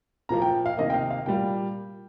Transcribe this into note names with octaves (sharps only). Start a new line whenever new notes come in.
A#2 F3 A#3 A#5
G5
F5
C3 D#3 A#3 D#5
G5
F5
F5
A#2 G3 A#3 G5